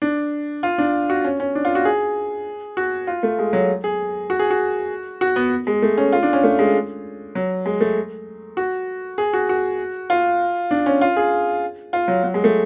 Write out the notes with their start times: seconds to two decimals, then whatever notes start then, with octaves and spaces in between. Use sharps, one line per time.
0.02 D4
0.63 F4
0.78 D4
1.10 F#4
1.24 C#4
1.40 C#4
1.55 D4
1.65 F4
1.75 F#4
1.85 G#4
2.77 F#4
3.07 F4
3.23 A3
3.39 G#3
3.53 F#3
3.84 G#4
4.30 F#4
4.39 G#4
4.51 F#4
5.21 F#4
5.36 B3
5.67 G#3
5.82 A3
5.98 C#4
6.13 F4
6.23 D4
6.33 C#4
6.44 A3
6.59 G#3
7.35 F#3
7.66 G#3
7.81 A3
8.57 F#4
9.18 G#4
9.33 F#4
9.49 F#4
10.10 F4
10.71 D4
10.86 C#4
11.01 F4
11.17 G#4
11.93 F4
12.08 F#3
12.24 F#3
12.34 G#3
12.44 A3